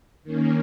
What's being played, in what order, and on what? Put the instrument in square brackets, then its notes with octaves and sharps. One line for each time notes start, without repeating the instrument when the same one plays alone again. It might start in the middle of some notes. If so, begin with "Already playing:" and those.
[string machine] D#3 A#3 C#4